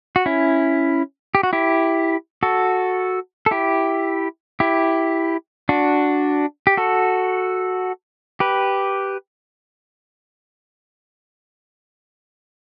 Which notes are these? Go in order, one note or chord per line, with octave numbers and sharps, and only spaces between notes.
F#4
C#4 E4
G4
F#4
E4 G4
F#4 A4
A4
E4 G4
E4 G4
D4 F#4
G4
F#4 A4
G4 B4